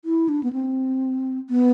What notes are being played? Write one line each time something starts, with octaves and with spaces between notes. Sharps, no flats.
E4
D4
B3
C4
B3